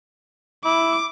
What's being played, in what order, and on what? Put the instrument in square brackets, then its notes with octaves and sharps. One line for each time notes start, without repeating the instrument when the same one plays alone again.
[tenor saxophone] E4 [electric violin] D6